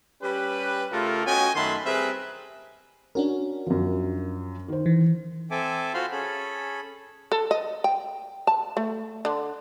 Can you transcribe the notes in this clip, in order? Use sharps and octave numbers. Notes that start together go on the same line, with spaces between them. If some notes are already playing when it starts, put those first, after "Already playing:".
G3 C#4 G4 B4
C#3 A3 F4 G4 A4 A#4
B3 C#4 F#4 D#5 G5 G#5
F#2 D#3 A3 A5 B5 C6
G3 C4 G#4 A#4 B4 E5
C#4 D4 F#4 A#4
F#2 F3
D#3 C5
E3
C4 A4 E5 G#5 D6
F4 F#4 C5 F5 B5 C6
C#4 G#4 A4 B5
A4
D#5
G5
A5
A3
D3